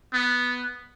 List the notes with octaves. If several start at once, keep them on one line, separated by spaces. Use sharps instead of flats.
B3